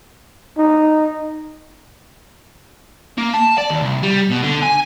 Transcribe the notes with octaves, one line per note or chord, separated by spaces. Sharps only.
D#4
A#3
A5
D5
D#2
C2
G3
B2
D3
G#5